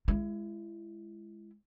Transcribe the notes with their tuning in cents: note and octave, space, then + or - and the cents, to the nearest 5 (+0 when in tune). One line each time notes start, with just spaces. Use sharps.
G#3 +0 E4 +30